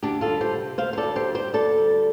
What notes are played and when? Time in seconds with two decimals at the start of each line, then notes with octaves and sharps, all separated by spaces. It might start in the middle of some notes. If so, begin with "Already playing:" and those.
0.03 D2 D4 G4
0.21 F4 A4
0.28 G3
0.41 G4 C5
0.53 C3
0.78 D2 C5 F5
0.93 C5
0.97 A4 D5
1.03 D2
1.16 G4 C5
1.28 G3
1.35 G4 C5
1.53 D2 A4 D5
1.78 G3